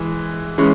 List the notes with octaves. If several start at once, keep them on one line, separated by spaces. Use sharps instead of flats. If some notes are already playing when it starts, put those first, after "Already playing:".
Already playing: E3 G#3
E3 G#3 C#4